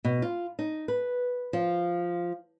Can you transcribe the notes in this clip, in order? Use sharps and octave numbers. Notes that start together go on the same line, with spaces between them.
B2
F4
D#4
B4
F3